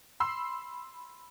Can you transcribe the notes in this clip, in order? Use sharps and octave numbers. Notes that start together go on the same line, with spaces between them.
B5 C6 E6 C7